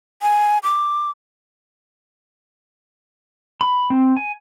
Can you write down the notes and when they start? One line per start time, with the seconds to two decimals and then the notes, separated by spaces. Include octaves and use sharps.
0.22 G#5
0.63 D6
3.61 B5
3.90 C4
4.17 G#5